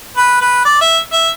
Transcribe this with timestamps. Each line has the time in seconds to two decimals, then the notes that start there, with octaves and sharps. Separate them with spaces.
0.17 B4
0.41 B4
0.65 D5
0.81 E5
1.12 E5